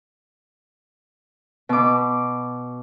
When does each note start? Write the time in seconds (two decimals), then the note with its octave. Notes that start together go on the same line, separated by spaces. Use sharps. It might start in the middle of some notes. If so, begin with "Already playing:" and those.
1.69 B2 D6